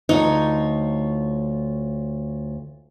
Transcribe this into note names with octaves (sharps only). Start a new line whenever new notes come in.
D2 D#4 F4 C#5